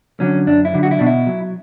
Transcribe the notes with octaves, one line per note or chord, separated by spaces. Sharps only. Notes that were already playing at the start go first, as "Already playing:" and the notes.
D3 F#3 C#4
F#2 D4
E4
D3 F#3
F#4
E4
B2 D4
E4
F#3